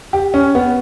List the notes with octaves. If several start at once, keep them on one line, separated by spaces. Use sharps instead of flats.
G4
C#4
B3